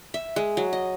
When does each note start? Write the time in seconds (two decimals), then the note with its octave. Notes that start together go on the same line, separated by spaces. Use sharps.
0.14 E5
0.36 G#3
0.57 F#3
0.73 D#5